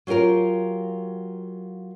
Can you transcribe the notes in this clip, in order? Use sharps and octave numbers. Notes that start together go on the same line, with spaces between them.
F#3 F4 G4 A#4 F5